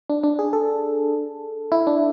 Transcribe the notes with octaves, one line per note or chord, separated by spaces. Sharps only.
D4
D4
G#4
A4
E4
D4